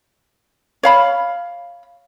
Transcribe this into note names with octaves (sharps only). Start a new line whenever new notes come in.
C#5 F5 B5